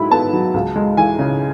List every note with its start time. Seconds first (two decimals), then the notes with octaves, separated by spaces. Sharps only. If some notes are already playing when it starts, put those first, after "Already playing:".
Already playing: G#2 F#3 E4 B5
0.11 B3 A5
0.33 F#3
0.54 C#2
0.76 G#3
0.97 E3 G#5
1.19 C#3